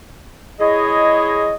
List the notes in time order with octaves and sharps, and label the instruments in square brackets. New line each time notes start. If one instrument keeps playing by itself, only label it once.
[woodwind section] G#3 E4 G#4 C#5 D#5